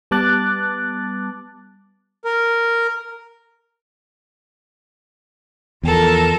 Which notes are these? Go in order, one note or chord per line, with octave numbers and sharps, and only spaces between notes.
G3 B3 A5 D6 F#6 A6
A#4
E2 F3 A4 A#4